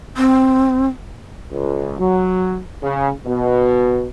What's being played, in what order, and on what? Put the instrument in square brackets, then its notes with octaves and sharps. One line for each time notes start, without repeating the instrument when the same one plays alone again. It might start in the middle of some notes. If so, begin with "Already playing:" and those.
[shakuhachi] C4
[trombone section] C#2
F#3
C#3
B2